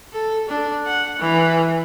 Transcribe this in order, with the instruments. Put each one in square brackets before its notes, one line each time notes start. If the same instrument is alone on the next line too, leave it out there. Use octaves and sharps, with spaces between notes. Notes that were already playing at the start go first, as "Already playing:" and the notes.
[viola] A4
D4
F#5
E3